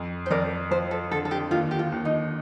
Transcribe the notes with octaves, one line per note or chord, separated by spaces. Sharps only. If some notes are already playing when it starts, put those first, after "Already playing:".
Already playing: F2
C5
F2 A#4 D5
F3 C5
A4
D3 A4
A4
G4
D#2 F4
G4
F4
D#2
D#4